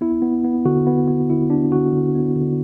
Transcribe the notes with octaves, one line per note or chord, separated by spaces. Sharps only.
B3 E4
B3
B3
D3 F#4
B3
B3
D3 E4
B3 D4
D3 F#4
D3
B3
D3